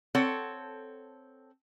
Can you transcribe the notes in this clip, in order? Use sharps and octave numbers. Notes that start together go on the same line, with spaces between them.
C4 A4 C#5 F#5